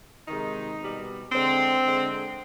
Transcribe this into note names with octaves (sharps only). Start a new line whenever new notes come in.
C3 D#3 G#3 D#4
B2 G3
D3 G#3 C4
D3 G#3